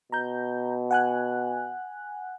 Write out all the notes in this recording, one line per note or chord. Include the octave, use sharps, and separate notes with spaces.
B2 A#5 G6
F#5 G#5 F#6